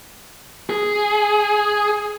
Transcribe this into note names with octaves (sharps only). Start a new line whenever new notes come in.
G#4